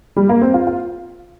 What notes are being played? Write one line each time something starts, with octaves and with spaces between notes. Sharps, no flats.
G3
A#3
C4
F4
F4